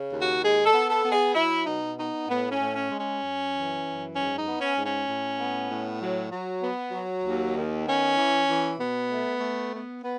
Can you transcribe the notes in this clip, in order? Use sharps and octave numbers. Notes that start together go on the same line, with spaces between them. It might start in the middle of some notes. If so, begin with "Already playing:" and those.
Already playing: C#3
D#2
F#4
G#3 G#4
A4
B3
A4
B3
G#4
F#3 E4
B2 D#4
B3 D#4
A2 B3
C#4
A2
C#4
G#3
C#4
F#2
E3
F#2
G#2 C#4
D#4
B3
C#4
G#2
C#4
A2
B3
A2
F#3
F#3
B3
F#3
D#2
D#3
B3 C#4
E3
E3
B2 B3
A3
A3
B3
B3